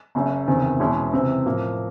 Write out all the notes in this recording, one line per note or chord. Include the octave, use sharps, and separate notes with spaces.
F#1 F#2 C#3
F#1 E2 C3 D#3
E2 B2 G#3 C#4 E4
C#2 C3 E3
A2 F3 A#3